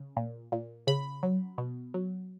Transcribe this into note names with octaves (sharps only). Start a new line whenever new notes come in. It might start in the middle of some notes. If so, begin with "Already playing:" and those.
Already playing: C#3
A#2
A#2
C#3 B5
F#3
B2
F#3